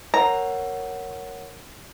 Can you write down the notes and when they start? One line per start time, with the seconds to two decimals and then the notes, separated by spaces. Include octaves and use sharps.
0.14 A#4 C#5 F#5 A#5